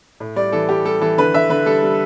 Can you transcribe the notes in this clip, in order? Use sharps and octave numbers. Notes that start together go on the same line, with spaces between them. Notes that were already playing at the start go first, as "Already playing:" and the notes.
A2
G3 D5
E3 A4
G3 G4
G3 A4
E3 A4
D3 B4
D3 E5
D3 B4
G3 A4
G3